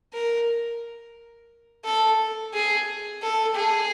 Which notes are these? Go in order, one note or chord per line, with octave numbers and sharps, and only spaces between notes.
A#4
A4
G#4
A4
G#4